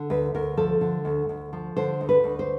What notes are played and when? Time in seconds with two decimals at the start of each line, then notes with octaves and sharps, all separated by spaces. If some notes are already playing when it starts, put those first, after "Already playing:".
Already playing: D3
0.10 D2 B4
0.34 D2 A#4
0.57 F3 A4
0.81 D3
1.05 D2
1.29 D2
1.53 F3
1.76 D3 C5
2.01 D2
2.09 B4
2.24 D2
2.39 C5